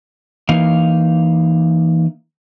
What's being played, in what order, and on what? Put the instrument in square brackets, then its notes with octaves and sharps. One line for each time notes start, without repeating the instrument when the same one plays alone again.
[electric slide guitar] E3 A#3 D#4 F5